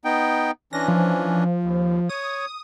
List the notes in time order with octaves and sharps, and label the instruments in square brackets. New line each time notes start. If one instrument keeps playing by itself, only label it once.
[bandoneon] B3 D#4 G5
[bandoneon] E3 C#4 D4 [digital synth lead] A#6
[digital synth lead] F3
[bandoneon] D#2
[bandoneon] C#5 [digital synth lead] D#6